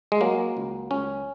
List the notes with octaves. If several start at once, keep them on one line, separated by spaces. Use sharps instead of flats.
G#3
F#3 A#3
C#2
C#2 C#4